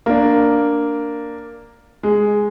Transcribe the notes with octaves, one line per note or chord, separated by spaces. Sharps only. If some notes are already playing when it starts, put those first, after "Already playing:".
A#3 D4
G#3